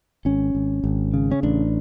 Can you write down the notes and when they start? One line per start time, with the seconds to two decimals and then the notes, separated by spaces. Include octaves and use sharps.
0.25 G#1 C#4
0.55 G#1
0.84 G#1
1.14 C#3
1.31 C#4
1.43 A1 D4